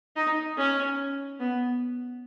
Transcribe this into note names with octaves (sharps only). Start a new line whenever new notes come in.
D#4
C#4
B3